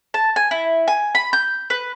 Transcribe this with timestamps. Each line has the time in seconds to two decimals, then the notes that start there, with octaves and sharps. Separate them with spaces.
0.14 A5
0.36 G#5
0.51 E4
0.88 G#5
1.15 B5
1.33 G6
1.70 B4